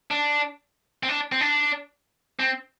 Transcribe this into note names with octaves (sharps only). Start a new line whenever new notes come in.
D4
C4
D4
C4
D4
C4